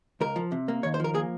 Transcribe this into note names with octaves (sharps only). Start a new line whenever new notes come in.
C#2 A#4
F3
C3
A#3
D#2 C#5
C5
F3 A#4
A#3 G#4